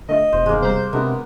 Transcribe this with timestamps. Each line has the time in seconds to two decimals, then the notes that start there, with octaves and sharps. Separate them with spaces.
0.09 D3 A3 F4 D#5
0.32 E1 C5
0.46 G2 D#3 G#3 A#3
0.62 C3 G3 C5 A#5
0.93 C3 G#3 B3 D4 F#4 A#4